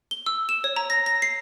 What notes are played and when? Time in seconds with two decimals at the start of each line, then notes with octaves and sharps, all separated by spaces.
0.11 G7
0.26 E6
0.49 E7
0.64 C#5
0.76 A#5
0.90 A#6
1.06 A#6
1.22 C7